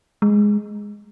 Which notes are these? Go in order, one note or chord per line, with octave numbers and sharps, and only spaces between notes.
G#3